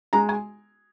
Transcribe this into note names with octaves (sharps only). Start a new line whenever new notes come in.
G#3 A#5
G#5